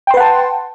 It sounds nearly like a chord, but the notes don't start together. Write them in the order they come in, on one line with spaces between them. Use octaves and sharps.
G5 C6 B4 F#5 A5